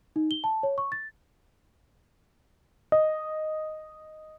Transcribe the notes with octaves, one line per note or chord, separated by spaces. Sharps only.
D#4
G7
A5
C#5
C#6
A6
D#5